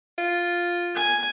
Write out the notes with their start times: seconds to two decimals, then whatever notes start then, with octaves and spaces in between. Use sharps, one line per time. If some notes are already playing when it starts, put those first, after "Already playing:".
0.18 F4
0.95 G#5